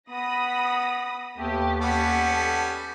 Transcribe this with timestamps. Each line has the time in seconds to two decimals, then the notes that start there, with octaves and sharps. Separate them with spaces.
0.10 B3 B5 D#6 A#6
1.38 D#2 A3 B3 G4
1.82 G3 B3 C#4 A4 F#5